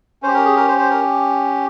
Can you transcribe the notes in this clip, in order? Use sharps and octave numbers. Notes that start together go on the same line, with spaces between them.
C#4 G4 C5
A#4
G#4
A#4
C5
C5
A#4